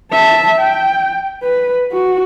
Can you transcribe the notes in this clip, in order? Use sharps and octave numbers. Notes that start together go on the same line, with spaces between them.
E5 A5
G5
B4
F#4